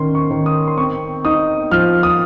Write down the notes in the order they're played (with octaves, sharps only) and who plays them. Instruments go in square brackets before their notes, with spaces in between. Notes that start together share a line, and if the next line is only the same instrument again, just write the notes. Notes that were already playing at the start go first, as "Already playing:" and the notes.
Already playing: [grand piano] D#3 C#4 C6
C#6
D#3
D#6
C6
C4 C#6
D#4 D#6
F3 F6
D#6